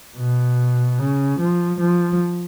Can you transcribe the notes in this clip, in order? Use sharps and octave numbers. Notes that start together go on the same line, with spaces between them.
B2
C#3
F3
F3